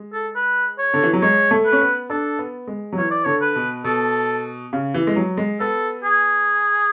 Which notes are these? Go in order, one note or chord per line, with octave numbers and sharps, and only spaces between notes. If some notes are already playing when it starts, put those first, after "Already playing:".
Already playing: G#3
A4
B4
C#5
D3
E3
F#3
G#3 C#5
A3
B4
C#4
B3
D4 A4
B3
G#3
F#3
E3 C#5
D5
D3 C#5
B4
B2
B2 A4
C#3
E3
G#3
F#3
G#3
B3 A4
G#4